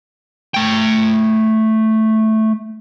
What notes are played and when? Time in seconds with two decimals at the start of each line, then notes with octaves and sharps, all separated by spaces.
0.54 A3 G5